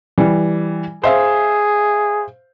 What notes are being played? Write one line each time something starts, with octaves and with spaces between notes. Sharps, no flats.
E3 G3
G#4 C5 E5 F5